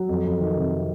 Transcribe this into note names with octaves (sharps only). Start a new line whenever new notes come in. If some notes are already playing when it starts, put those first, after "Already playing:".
Already playing: F#3
F2
F2
D#3
C3